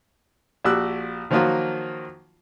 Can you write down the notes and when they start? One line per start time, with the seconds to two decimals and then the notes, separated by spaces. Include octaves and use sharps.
0.65 A#1 F#4 G4 E6 F#6
1.31 D#3 F3 F#3 A#3 F4 F#4